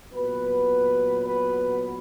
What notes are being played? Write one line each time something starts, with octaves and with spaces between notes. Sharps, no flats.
A#2 F#3 B3 B4
B4